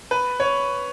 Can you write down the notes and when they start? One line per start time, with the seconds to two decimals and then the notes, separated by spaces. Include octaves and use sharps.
0.11 B4
0.40 C#5